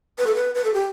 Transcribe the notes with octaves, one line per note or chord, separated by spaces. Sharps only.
B4
A4
B4
B4
A4
G4